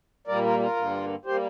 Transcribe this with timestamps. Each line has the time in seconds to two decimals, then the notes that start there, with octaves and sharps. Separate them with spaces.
0.27 A#2 G3 A#3 A#4 D5
0.44 F4 A#4
0.59 F4 A#4
0.76 G2 D3 A#3
1.25 G3 A#3 G4 C5